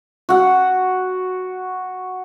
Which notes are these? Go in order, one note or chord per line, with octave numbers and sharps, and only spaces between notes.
F#4 F#5